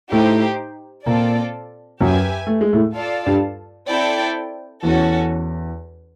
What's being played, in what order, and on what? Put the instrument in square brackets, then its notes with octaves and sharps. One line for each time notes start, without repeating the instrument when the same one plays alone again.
[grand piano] A2 A3 [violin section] D#4 G4 C5
[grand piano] A#2 A#3 [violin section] C4 F4 A4 D5
[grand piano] F#2 F#3 [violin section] G4 B4 E5 G#5
[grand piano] A3
G#3
A2 A3
[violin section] F4 A4 D5 F5 A5
[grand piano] G2 G3
[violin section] C4 E4 A4 D5 G5
[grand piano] E2 E3 [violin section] C#4 F#4 A4